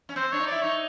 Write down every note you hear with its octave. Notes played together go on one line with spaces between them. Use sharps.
C#4
C4 C5
D4 C#5
D#4
E4 D5
D#4 C#5